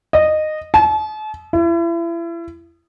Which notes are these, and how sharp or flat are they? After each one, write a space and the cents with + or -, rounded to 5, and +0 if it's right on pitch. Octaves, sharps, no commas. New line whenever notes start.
D#5 -15
A5 -40
E4 +35